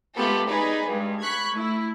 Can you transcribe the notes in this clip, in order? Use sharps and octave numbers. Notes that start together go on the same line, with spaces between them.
G#3 A3 B3 F4 G4 A4
D#4 G#4 B4 D5 G#5 B5
G2 G#3
B5 C#6 F#6 G#6 B6
A3 E4